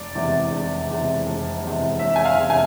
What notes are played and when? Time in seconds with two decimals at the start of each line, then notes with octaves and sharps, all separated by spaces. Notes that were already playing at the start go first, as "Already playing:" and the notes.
Already playing: F1 D5
0.15 E2 C3 G#3
0.52 F1
0.90 E2 C3 G#3
1.26 F1
1.64 E2 C3 G#3
1.99 F1 E5
2.16 G#5
2.25 F5
2.37 E2 C3 G#3
2.50 G#5